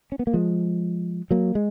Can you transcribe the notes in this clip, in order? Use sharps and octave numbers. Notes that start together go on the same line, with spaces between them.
C#4
B3
A#3
F3 G#3
F#3 A#3
G#3